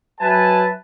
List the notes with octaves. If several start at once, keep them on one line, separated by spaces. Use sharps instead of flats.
F#3 B4 E5 G#5 A5